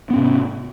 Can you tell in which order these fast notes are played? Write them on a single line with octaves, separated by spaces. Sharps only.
B3 C#4 G#2 C3